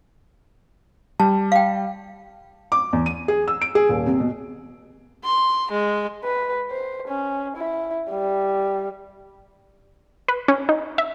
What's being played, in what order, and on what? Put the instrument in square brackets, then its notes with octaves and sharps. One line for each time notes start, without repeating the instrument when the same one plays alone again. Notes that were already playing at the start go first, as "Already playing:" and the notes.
[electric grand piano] G3 [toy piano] A5
[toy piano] F5 G5
[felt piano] D6
E2
D#7
G#4
E6
D7
G#4
D#1
C3
B2
[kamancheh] C6
G#3
[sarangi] B4
C5
C#4
E4
G3
[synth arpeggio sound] B4
C#4
D#4
E5